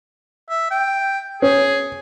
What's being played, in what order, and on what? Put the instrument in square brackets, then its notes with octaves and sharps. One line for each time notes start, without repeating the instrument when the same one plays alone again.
[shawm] E5
G5
[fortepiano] C#4 [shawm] G#4